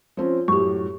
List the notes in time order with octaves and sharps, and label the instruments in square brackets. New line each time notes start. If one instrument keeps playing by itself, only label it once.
[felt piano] F3 C4 C#4
[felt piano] F#2 A2 [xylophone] G4 C#6